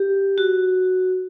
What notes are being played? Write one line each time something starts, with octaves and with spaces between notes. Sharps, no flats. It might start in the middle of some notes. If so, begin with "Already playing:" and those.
Already playing: G4
F#4